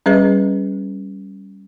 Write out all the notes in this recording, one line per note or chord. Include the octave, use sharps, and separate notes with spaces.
G3 C#4 G#4 B4 D#5